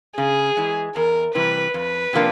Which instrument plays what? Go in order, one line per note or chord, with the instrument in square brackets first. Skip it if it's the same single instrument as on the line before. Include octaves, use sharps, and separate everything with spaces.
[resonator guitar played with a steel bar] C#3 [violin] G#4
[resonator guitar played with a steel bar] E3 G#3
[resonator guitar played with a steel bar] E2 [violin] A#4
[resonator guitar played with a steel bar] C3 E3 G3 [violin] B4
[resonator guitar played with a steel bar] F2 [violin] B4
[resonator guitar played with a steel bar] C3 F3 A#3 D4